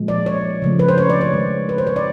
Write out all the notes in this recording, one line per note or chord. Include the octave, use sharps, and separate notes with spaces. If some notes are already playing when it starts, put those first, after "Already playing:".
Already playing: A#2 F3 G#3
D5
C#5
C#3 F3 A3
B4
C5
C#5
D5
C#5
D#3 G#3
B4
C5
C#5
D5